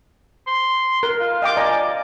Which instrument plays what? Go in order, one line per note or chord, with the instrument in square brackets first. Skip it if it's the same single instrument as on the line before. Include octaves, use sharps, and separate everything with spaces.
[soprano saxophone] C6
[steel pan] A#4
[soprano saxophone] F4
[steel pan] D#5 G5 D6
D5 G#5 A#5